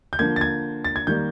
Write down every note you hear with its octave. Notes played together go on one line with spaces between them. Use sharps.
G6
D3 F3 A#3 G#6
A6
G#6
A6
G#6
D#3 G3 A#3 G6